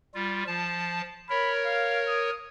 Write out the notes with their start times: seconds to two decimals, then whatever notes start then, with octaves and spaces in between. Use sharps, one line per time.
0.14 G3 F4
0.47 F3 A5
1.30 A#4 C#5 B5
1.65 F5
2.07 D#6